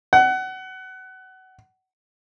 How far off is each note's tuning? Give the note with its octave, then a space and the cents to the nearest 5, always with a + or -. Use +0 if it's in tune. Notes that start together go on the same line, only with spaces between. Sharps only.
F#5 +25